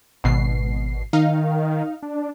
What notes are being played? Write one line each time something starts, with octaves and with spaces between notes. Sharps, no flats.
G#1 B2 C7
D#3 D#4 F5
D4